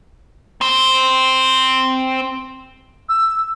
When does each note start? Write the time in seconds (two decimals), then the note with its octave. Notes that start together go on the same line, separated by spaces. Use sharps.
0.61 C4 C5
3.09 E6